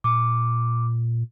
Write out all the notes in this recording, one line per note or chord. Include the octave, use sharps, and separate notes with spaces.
A#2 D6